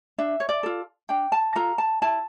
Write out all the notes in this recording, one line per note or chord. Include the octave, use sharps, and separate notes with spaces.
D4 E5
C#5
D5
F4 A4
D4 G5
A5
F4 A4 A#5
A5
E4 A5